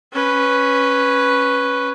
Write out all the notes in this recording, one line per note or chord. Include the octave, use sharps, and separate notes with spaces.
C#4 B4